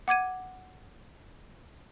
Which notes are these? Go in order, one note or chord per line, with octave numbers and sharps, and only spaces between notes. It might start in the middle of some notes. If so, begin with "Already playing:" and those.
F#5 D6 G#6 D#7